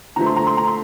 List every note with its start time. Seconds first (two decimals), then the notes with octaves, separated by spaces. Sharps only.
0.16 D3 F3 A3 A#5
0.26 C6
0.37 A#5
0.47 C6
0.57 A#5
0.67 C6